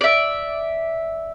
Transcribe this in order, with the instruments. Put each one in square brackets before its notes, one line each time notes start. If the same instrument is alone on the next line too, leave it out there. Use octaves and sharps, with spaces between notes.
[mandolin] D5 E5